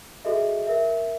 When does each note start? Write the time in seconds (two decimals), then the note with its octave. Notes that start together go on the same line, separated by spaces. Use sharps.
0.25 F#4 G#4 A4 D#5 E5
0.67 A#4 E5